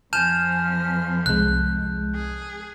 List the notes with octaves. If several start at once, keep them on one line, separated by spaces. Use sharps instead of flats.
F2 F3 G#5 A5 F6 G6 E7
C2 G#3 F#6
G#4